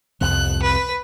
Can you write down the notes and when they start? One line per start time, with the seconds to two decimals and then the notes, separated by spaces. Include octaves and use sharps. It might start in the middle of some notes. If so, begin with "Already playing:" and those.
0.21 C2 F2 F3 F#6
0.62 B4